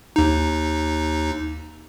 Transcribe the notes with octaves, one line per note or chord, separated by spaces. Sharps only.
D#2 D#4